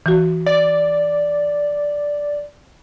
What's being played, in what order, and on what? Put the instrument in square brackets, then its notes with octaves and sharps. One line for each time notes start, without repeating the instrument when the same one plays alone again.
[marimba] E3 F#4
[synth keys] D5